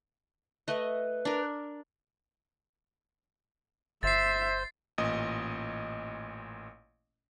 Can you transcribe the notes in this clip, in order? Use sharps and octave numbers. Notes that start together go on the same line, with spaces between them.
A3 B4 D#5
D4 A#4
G1 C5 E5 A6 C7
A1 A#2 D#5 D#6